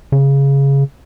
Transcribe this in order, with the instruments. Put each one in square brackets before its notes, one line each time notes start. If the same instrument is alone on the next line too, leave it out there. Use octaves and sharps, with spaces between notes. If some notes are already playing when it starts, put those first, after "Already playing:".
[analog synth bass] C#3